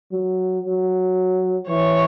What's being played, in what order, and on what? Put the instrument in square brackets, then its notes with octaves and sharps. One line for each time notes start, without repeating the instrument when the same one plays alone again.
[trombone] F#3
F#3
[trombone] E3 [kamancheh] C#5